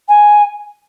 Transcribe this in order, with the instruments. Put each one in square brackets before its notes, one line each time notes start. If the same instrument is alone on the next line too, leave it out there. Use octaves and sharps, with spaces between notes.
[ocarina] G#5